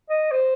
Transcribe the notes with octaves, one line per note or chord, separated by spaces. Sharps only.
D#5
C5